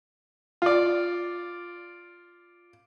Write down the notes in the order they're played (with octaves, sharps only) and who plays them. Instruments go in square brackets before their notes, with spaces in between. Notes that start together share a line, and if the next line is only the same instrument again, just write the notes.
[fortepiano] F4 D5